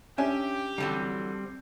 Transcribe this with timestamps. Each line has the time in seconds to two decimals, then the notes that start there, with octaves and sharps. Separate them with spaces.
0.18 C#4 D4 G4 E5 G#5
0.78 D3 E3 F#3 G3 C4